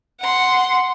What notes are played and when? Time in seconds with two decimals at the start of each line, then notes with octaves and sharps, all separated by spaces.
0.21 F#5 C6